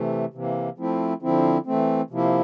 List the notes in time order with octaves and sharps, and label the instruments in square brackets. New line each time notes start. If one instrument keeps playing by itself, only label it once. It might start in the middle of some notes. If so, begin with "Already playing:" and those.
Already playing: [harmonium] C3 E3 A3
C3 E3 A#3
F3 A3 C4 E4
D3 F3 C4 E4
E3 A3 C4
C3 F3 A#3 E4